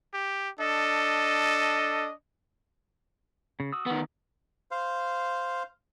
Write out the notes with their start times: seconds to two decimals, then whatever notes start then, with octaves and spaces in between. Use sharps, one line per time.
0.13 G4
0.60 D4 A4 D#5
3.60 C#3
3.72 F#4 D#6 E6
3.86 D#3 B3
4.71 C5 F5